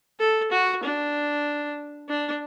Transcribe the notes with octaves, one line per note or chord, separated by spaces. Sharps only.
A4
F#4
D4
D4